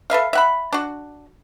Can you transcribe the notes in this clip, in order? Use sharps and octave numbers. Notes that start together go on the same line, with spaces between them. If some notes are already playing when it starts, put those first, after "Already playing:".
A4 B4 E5 F5
E5 F#5 B5
D4 F#4